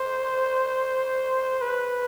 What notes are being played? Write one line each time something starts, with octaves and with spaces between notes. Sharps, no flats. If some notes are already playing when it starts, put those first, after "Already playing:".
Already playing: C5
B4